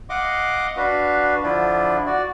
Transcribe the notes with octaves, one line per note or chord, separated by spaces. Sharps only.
D#5 F5 F#5 C6 D6
D4 F#4 B4 F5
D3 F3 D4 E4 F4
F#4 D5